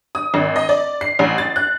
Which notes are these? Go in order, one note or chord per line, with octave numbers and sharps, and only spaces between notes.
D#6
G#1
D#5
D5
C7
A1
A6
F#6